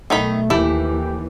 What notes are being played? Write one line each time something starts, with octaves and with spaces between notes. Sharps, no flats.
B1 D#3 A3 D#4 B5
D#2 E3 A3 E4 G4